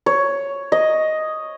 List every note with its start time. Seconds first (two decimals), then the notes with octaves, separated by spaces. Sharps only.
0.06 C#5
0.72 D#5